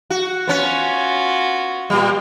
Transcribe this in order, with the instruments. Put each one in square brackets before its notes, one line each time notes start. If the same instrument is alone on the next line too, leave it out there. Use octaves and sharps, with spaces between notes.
[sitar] F#4
[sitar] B3 C#4 [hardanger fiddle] F4 F#4
[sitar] A#2 G3